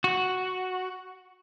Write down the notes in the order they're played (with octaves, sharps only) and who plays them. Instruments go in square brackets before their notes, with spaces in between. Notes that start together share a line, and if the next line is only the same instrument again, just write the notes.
[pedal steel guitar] F#4